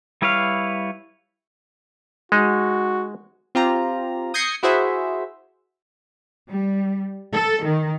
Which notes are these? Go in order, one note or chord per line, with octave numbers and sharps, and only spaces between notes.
G3 E4 B4 C#5 F5
G#3 D#4 F#4
C4 F4 G4 A#5
D#6 G6 G#6 A#6 C7 C#7
E4 F#4 G#4 C5 E5
G3
A4
D#3